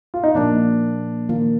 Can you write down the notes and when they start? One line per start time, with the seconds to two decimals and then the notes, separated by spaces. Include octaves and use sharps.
0.14 F4
0.23 D#4
0.35 A#2 F3 A#3 D4
1.29 D#3 A#3 F4